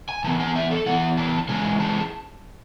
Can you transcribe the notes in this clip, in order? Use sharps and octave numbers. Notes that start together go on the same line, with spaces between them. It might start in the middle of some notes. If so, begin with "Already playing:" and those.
G#5
E3 B3 A5
G#5
E5
A4
E3 B3 F#5
A5
E3 G#3 C#4 G#5
A5